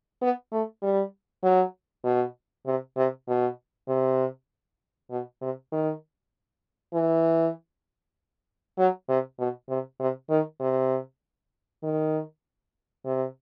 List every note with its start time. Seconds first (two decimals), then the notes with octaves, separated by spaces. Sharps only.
0.22 B3
0.52 A3
0.83 G3
1.43 F#3
2.05 B2
2.66 C3
2.97 C3
3.28 B2
3.88 C3
5.10 B2
5.41 C3
5.72 D#3
6.94 E3
8.78 F#3
9.09 C3
9.39 B2
9.69 C3
10.00 C3
10.30 D#3
10.60 C3
11.83 D#3
13.06 C3